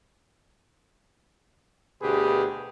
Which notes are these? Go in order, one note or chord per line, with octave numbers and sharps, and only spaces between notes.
D2 B2 G4 G#4 B4